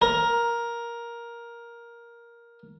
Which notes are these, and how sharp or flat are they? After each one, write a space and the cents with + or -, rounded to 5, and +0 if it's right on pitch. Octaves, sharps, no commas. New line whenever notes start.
A#4 +10